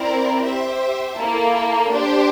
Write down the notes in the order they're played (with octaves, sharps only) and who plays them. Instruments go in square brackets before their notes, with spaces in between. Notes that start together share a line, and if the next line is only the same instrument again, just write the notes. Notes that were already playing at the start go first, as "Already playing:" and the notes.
Already playing: [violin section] C4 E4 A#4 D5
G4 C5 E5
A#3 E4 A4
D4 G4 C5